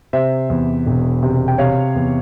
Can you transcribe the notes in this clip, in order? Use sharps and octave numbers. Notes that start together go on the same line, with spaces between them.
C3 C5 E5
E2
E1
C3
G5
C3 C#5 F5
E2